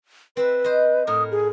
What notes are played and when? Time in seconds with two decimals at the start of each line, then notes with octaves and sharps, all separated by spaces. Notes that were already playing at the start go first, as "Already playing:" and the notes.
0.37 C4 B4 E5
0.64 C5 D#5
1.07 A2 A#4 D#6
1.31 G#4